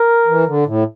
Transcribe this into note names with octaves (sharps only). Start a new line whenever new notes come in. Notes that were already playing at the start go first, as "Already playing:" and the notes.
Already playing: A#4
E3
D3
A2